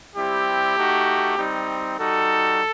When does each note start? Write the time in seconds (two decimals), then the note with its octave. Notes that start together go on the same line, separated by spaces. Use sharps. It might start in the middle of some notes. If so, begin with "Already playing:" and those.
0.14 G3 C4 E4 G4
0.75 A3 D#4 F#4
1.37 G3 C4 D#4
1.98 G3 D#4 F#4 A4